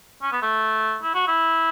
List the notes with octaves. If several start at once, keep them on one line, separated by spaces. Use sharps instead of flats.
C#4
B3
A3
E4
F#4
E4